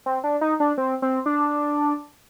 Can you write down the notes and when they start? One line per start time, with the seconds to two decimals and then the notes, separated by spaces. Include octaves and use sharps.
0.06 C4
0.24 D4
0.41 D#4
0.60 D4
0.78 C4
1.02 C4
1.26 D4